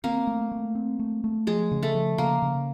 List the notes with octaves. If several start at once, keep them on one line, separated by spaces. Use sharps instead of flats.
A#3 C4 A#4
A3
A3
C4
A3
A3
F3 G#3 G#4
C#3
A3 A4
F3
C#3 A#3 A#4
C#3